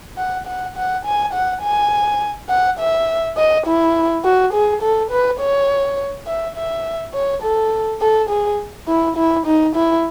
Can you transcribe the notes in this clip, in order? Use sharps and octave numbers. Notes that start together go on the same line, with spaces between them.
F#5
F#5
F#5
G#5
F#5
G#5
F#5
E5
D#5
E4
F#4
G#4
A4
B4
C#5
E5
E5
C#5
A4
A4
G#4
E4
E4
D#4
E4